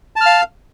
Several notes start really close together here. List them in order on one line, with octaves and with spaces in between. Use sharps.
A5 F6 F5